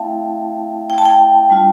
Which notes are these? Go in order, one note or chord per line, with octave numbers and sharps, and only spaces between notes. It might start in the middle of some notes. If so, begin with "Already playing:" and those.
Already playing: A3 C4 E4 E5 F5 G5 A5
G5
A5
G5
G3 D4 F4